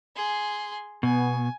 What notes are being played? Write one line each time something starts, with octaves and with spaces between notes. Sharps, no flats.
G#4 C6
B2 B3 G#5